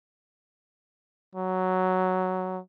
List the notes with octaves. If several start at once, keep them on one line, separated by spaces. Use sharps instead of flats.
F#3